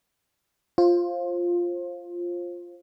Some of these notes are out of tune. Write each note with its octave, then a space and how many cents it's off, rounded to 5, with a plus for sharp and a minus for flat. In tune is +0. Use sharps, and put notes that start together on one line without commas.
F4 +0 C5 +25